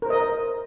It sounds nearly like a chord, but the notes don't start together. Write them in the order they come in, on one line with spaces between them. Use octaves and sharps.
A#4 C5 D#5